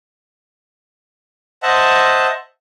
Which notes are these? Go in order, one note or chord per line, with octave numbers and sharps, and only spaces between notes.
C5 D#5 E5 F#5 A5